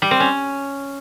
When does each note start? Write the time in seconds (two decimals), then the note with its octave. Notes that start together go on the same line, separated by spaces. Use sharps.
0.02 G3
0.11 C4
0.20 C#4